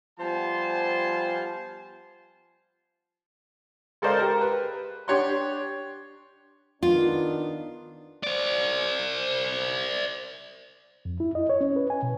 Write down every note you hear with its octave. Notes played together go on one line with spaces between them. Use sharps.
F3 G3 B3 C5 G#5 A5
G#3 A4 A#4 C5 D5 F5
G4 A#4
B4
D4 G4 C#5 F#5 C6
D#3 B3 D4 F4
C5 D5
F2
E4
D#5
C#5
C#4
B4
G#5
B2